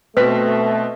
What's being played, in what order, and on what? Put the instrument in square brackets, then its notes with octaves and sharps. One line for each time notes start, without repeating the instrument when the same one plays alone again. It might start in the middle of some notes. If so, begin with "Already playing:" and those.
[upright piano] B2 C4 B6 [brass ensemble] A3 [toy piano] B4